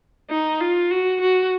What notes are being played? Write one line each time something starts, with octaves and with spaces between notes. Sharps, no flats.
D#4
F4
F#4
F#4